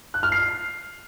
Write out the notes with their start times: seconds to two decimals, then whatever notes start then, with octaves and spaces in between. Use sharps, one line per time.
0.14 F#6
0.23 F6
0.32 C7